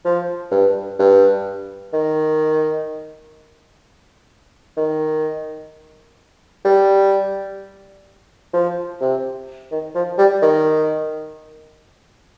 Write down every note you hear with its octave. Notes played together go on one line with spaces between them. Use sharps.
F3
G2
G2
D#3
D#3
G3
F3
C3
D#3
F3
G3
D#3